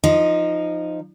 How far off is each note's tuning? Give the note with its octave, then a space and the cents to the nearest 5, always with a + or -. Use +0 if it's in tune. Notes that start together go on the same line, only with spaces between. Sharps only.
F3 -5 D#4 +0 D#5 +0